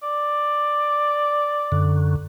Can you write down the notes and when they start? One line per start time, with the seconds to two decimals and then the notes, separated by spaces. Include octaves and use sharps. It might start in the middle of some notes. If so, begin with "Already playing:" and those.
0.03 D5
1.72 F#2 D3